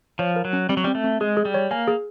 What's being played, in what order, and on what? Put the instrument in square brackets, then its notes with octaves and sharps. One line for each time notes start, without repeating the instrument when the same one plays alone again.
[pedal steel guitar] F3 [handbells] C#5
[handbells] A#4
[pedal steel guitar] F#3
[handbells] C#4
[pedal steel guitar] G3 [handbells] C4
[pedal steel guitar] F#3
[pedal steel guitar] G3 [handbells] C4
[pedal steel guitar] A3
[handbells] C4
[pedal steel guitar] G#3 [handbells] G#4
[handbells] G#4
[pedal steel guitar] G3
[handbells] C#5
[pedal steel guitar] A#3 [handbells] G#5
[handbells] G#4